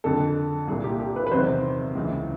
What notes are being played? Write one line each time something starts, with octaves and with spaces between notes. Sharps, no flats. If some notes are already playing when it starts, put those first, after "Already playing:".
F2 D3 A4
C2 A#2 G#4
G4
G4
B4
B4
E2 C3 D#3 C5
C#2 C#3 E3